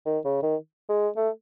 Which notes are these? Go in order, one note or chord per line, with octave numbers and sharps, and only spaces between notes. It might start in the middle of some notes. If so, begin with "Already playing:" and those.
D#3
C#3
D#3
G#3
A3